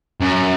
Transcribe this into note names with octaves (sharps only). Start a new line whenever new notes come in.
F#2